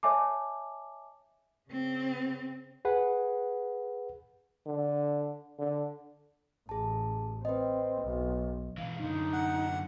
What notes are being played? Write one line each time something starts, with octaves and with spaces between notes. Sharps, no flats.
C#5 D#5 E5 G#5 A5 D6
C#3 C4
G#4 B4 F#5
D3
D3
A1 G#4 A5
C4 B4 D#5
B1
B2 E3 F5
F#2 D3 D#4
F#5